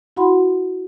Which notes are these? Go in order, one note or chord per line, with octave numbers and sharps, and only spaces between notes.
E4 F#4 F#5 B5 C6